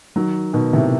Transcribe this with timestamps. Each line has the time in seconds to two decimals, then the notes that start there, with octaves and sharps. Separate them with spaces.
0.16 D#3 F#3
0.53 B2 D#3
0.73 A2 C3